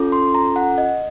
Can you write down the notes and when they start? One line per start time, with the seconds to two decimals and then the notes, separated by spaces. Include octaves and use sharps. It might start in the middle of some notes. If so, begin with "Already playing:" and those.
Already playing: C#4 F4 A4
0.12 C6
0.35 A#5
0.56 F#5
0.78 D#5